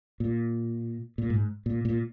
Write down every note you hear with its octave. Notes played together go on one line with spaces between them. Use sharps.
A#2
A#2
G#2
A#2
A#2